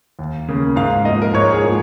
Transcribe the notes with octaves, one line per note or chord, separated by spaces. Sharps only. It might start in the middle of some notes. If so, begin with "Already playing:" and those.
D#2
C#3 A#3
G#2 F5
F3 A#3 D#5
A#4
G#2 C#5
G#4
F3 A#3